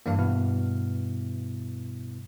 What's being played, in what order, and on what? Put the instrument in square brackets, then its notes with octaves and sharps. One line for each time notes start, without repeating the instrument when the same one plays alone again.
[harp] G2 E3 [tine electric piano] A#3 D4 F5
[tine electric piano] B2 B3 E4 [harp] F6